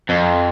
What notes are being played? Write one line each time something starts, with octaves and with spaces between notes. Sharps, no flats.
F2